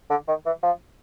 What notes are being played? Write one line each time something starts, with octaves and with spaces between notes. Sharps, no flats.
D3
D#3
E3
F3